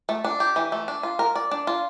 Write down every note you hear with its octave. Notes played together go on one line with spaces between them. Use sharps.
A3
D4
G4
E3
A3
D4
F4
A#4
D5
D4
F4